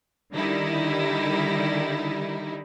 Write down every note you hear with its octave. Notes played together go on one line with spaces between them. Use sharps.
D3 D#3 G3 D#4 E4